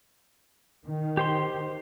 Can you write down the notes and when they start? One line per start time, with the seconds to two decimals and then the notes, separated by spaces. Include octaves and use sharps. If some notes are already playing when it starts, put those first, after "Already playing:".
0.84 D#3
1.17 G4 C5 C6